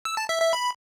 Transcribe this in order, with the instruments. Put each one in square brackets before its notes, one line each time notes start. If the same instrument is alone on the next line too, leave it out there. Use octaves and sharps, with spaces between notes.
[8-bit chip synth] E6
A5
E5
E5
B5